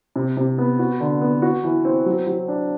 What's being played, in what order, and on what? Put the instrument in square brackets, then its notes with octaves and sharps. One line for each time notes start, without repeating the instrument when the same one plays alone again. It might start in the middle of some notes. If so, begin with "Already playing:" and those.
[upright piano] C3
C3
B3
F#4
D3
B3
F#4
E3
C4
F#3
F#3
D4